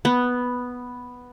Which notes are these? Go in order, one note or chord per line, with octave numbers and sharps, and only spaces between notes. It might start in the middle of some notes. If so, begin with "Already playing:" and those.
B3